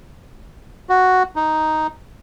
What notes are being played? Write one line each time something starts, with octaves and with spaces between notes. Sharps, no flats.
F#4
D#4